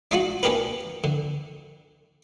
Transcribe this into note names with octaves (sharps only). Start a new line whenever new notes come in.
D4 D#4 F4 F#4
C#4 D4 G4 A#4 B4
D3